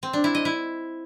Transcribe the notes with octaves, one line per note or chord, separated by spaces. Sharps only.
C4
D4
E4
D#5
E4